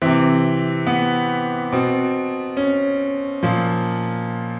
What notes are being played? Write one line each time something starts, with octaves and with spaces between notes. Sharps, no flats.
C3 E3 C4
B3
B2 C4
C#4
A#2 F3